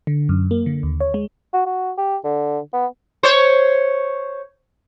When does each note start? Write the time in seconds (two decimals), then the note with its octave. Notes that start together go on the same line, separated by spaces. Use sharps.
0.07 D3
0.29 F#2
0.51 A#3
0.66 D3
0.83 D#2
1.01 C#5
1.14 G#3
1.53 F#4
1.66 F#4
1.98 G4
2.24 D3
2.73 B3
3.23 C5 C#5